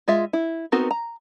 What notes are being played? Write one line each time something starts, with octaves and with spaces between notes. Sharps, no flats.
G#3 F4 E5
E4
B3 C4 D#4 F#4 A#4
A#5